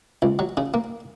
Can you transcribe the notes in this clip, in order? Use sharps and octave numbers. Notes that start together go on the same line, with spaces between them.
C#2
F#3
C#3
A#3